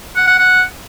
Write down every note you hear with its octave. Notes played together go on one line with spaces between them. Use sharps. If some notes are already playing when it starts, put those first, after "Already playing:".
F#5
F#5
F#5